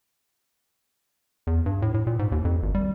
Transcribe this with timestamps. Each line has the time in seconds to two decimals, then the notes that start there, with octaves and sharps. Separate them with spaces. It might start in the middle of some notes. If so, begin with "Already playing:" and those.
1.47 E2
1.66 G2
1.82 A2
1.94 A2
2.07 A#2
2.19 G#2
2.32 D#2
2.45 F2
2.63 G#1
2.75 G3